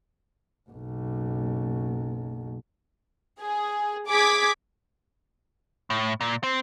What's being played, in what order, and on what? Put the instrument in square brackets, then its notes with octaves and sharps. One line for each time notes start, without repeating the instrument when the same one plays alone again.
[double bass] F#1 B1
[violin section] G#4
G#4 D6 G#6 B6
[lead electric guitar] A2
A#2
C4